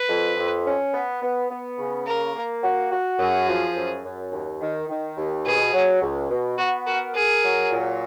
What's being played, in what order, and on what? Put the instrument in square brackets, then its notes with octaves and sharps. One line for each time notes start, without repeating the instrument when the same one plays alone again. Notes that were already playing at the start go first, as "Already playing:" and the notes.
Already playing: [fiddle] B4
[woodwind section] F2
F2
C#4
B3
B3
B3
C#3
[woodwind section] A#3 [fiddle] A#4
[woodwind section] A#3
F#4
F#4
[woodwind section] F#2 [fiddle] G#4
[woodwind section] F3
F#2
F#2
D#2
D#3
D#3
D#2
[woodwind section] B2 [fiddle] G#4
[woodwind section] F#3
C#2
B2
[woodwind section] B3 [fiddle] F#4
[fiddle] F#4 [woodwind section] A#4
[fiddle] G#4 [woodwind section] A#4
[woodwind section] F#3
A#2